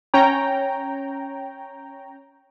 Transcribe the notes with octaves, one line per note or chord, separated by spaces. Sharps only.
C#4 C#5 G5 A#5